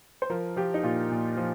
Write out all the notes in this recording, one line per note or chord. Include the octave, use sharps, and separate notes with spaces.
C5
F3 A#4
F3 G4
D#4
A#2 F4
A#2
F3